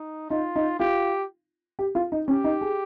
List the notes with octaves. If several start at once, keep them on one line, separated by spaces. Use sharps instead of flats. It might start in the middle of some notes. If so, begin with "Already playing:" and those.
Already playing: D#4
D#4 F4
D#4
F4 G4
G4
F4
D#4
C#4 G4
D#4
G#4